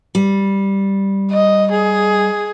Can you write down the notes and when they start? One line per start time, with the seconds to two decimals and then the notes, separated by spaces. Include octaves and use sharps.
0.15 G3
1.31 D#5
1.72 G#4